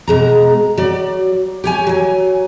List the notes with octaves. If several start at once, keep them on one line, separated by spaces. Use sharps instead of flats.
B2 G#3 A#5
F#3 D5
G4 C#5 G#5
F#3 G#5